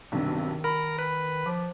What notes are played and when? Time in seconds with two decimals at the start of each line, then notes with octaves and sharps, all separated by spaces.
0.12 B1 G2 C3 D#3
0.64 A#4 B5
0.99 B4
1.46 F3 D6